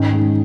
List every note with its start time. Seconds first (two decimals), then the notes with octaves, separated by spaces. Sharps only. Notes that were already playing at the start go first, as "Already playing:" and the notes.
Already playing: G#2 D#3 C#4
0.13 G#3